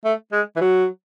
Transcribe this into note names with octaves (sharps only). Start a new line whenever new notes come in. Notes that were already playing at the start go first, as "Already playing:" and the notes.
A3
G#3
E3
F#3